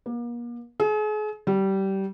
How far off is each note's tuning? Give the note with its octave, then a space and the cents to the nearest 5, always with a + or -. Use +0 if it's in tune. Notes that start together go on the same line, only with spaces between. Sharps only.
A#3 +40
G#4 +40
G3 -20